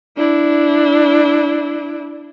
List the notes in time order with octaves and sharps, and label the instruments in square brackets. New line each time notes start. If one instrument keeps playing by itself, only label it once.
[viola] D4 E4